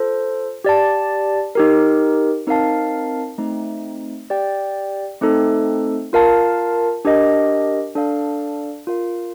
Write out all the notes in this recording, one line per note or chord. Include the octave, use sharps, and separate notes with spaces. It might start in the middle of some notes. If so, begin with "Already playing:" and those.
Already playing: F4 A4 C5
G4 D5 A5
D#4 G4 A#4
C4 D#4 A#4 F5 A5
A3 C4 D#4
G4 D5 G5
A3 C4 D#4 A4
F4 A#4 F5 A5
D4 G4 A#4 D#5
D4 A4 D5 F5
F4 A#4 F5